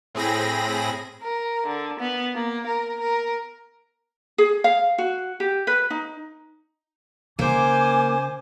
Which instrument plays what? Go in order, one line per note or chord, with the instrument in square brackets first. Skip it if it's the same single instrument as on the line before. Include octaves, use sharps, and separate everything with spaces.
[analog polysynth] A2 C4 G#4 B5 A#6
[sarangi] A#4
D3
B3
A#3
A#4
A#4
[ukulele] G#4
F5
F#4
G4
B4
D#4
[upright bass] C#3 [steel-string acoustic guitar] A#3 [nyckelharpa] C5 [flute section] G#5 D6